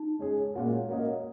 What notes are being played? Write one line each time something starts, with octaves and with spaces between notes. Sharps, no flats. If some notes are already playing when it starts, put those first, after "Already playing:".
Already playing: D#4
G#3 C#4 G#4
A#2 G#3 C#4 F#4 A#4
A#3 C#4 F#4 A#4 D#5